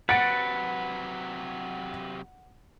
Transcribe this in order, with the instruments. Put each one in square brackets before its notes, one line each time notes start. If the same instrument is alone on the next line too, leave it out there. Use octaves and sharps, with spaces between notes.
[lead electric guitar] C3 F#3 [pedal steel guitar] B4 [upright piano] F#5 [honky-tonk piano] A6 C#7 D7